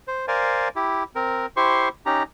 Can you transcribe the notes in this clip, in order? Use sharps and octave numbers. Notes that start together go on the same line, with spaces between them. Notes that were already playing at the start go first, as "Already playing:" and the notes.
C5
A#4 C5 D5 F5 G#5
E4 G4
C4 A#4
E4 G4 C5 C6 C#6
C#4 D#4 G4 A#5